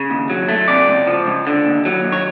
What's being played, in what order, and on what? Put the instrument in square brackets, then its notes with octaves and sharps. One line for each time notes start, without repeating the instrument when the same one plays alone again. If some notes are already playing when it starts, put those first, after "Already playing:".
Already playing: [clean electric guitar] C#3
D#2
F#3
A3
C3 D5
C#2
F3
C#2
D3
D#2
F#3
D#2
C#5